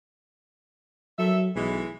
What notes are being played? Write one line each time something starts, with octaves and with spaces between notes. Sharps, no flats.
D#3 F#3 A4 E5
B1 E3 G#3